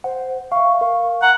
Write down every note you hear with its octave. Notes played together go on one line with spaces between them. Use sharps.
C5 F#5
E5 F5 C#6
A#4 F5 C#6
F#5 A#5